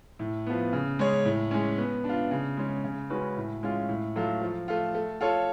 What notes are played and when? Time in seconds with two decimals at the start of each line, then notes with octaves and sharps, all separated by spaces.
0.19 A2
0.47 F3 B3
0.73 C#3
0.99 G#3 C#4 G#4 C#5
1.25 A2
1.51 G#3 C#4
1.78 B3
2.04 D4
2.09 F4
2.31 C#3
2.57 G#3 C#4
2.84 C#3
3.10 G#3 C#4 F#4 B4
3.37 A2
3.63 G#3 C#4 F4
3.89 A2
4.16 F#3 A3 F4
4.42 F3
4.68 A3 F4
4.95 A3
5.21 F4 A4 C#5